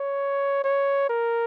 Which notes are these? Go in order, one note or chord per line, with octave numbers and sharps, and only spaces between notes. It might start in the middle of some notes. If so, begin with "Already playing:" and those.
Already playing: C#5
C#5
A#4